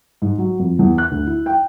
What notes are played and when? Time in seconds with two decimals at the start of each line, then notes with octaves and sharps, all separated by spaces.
0.22 G#2
0.38 F#3
0.59 F2
0.79 E2
0.98 F#6
1.11 D2
1.27 E4
1.46 G5